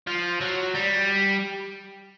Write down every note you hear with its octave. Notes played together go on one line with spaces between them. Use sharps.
F3
F#3
G3